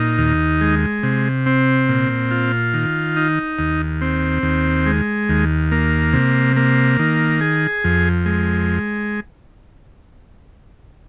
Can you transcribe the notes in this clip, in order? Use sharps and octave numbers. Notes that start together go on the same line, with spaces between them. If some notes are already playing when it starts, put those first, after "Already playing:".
Already playing: A#2 D#4
D#2
G#3
C3
C4
A#2
F4
D#3
D#4
D#2
C4
D#2
G#3
D#2
A#3
C3
A#3
D#3
G#4
F2
G#3